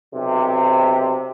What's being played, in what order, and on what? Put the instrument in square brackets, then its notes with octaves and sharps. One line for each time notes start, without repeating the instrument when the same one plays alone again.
[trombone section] B1 C3